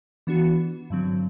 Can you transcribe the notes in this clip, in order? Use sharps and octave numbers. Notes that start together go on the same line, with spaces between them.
E3 B3 D4 F#4
G2 D3 F#3 C4